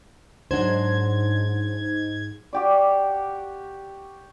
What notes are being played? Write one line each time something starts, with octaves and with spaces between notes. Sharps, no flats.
G#2 F#3 D4 C5 G#6
F#4 G4 D5